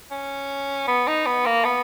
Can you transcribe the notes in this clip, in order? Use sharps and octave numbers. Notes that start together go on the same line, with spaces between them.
C#4
B3
D#4
B3
A#3
B3